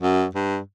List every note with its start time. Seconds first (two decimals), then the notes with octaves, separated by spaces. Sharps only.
0.02 F#2
0.35 G2